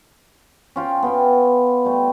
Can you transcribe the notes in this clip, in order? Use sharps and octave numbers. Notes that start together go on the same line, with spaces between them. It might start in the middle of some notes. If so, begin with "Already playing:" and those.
C#4 F4 G5
B3 G5 C6
G3 A3